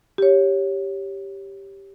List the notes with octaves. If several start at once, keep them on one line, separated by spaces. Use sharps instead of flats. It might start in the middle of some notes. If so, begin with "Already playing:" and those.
G4 C#5